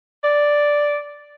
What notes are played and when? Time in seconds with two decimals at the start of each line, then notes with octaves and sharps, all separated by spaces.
0.24 D5